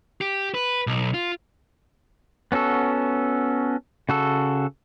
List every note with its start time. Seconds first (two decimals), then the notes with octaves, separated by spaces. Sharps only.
0.21 G4
0.54 B4
0.87 B1
1.14 F4
2.52 B3 C#4 F#4 A4
4.09 C#3 F#4 A4